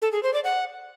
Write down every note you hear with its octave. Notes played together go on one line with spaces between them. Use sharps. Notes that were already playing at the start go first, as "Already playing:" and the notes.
A4
G#4
C5
D5
F#5